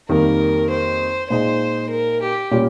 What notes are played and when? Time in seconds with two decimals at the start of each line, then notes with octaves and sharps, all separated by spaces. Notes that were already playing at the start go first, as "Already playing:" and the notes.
0.09 F2 D#3 G3 A#3 A#4
0.70 C5
1.30 A#2 G#3 D#4 C5
1.90 A#4
2.22 G4
2.51 A#2 G3 C#4 F4